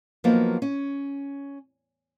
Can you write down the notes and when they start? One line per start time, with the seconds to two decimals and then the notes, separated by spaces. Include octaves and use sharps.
0.24 F3 F#3 A#3 B3 D#4
0.62 C#4